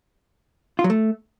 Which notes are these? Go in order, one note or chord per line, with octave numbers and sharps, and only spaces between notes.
F4
F#3
A3